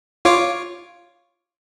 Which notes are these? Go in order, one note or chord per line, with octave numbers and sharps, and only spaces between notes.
F4 C#5 D6